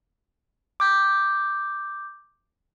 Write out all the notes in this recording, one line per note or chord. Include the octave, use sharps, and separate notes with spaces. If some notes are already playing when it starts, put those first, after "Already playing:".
D6 G6